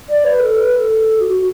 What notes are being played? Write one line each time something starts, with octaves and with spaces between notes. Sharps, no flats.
D5
B4
A4
B4
B4
A4
F#4